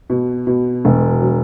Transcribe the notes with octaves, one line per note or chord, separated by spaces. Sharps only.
B2
B2
E1
F#3